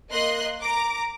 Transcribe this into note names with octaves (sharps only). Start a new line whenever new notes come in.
A#3 D#5 C6 F#6
A#5 D6